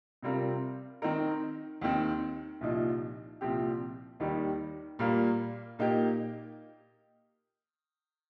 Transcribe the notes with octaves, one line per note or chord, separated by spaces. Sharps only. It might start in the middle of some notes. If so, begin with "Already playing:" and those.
C3 G3 C4 F4 A#4
D#3 C4 D#4 A#4
D#2 D#3 C4
C2 A#2 F3 D#4
C2 A#2 F3 C4 G4
D#2 D#3 G3 D#4
A#2 G3 A#3 F4 A#4
A#2 A#3 D#4 G4